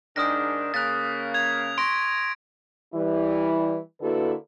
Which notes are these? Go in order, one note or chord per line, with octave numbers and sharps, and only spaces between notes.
G#2 D#3 D4 D#6 F6 A#6
C#3 A#3 D#6 F#6 A6 B6
G#6 F7
C6 C#6 A#6 D7
E3 G3 E4
D3 A#3 E4 F#4 A4 B4